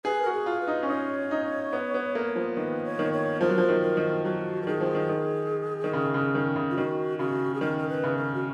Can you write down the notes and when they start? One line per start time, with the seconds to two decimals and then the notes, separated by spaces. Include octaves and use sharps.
0.05 G#4 B4
0.22 F#4 A#4
0.33 G#4
0.46 F4
0.61 B4
0.67 D#4
0.83 C#4
0.89 D#4 C#5
1.31 D#4
1.73 B3
1.94 B3
2.15 A#3
2.36 F3
2.57 D#3 B4
2.85 C#5
2.99 D#3
3.13 C#5
3.41 F3 A#4
3.49 F#3
3.58 F3
3.69 D#3
3.83 A#4
3.97 D#3
4.25 F#3 F#4
4.62 A#4
4.67 D#3 G#4
4.81 F3
4.95 D#3
5.09 D#3
5.84 D#3
5.93 C#3
6.14 C#3
6.35 D#3
6.56 C#3
6.71 F4
6.77 D#3 F#4
7.19 C#3 F#4
7.54 G#4
7.61 D#3 A#4
7.78 A#4
7.89 B4
8.04 C#3
8.17 A#4
8.34 F#4